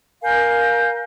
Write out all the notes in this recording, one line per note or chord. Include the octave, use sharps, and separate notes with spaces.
A#4 F5 G#5 G6